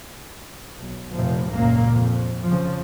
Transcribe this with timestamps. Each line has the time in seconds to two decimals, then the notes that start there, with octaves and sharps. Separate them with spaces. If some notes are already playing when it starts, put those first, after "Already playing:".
0.81 B1
1.14 F1 A#1 C3 F3
1.51 G#1 C#2 F#2 A#2 A#3
1.90 F2
2.47 C#3 F3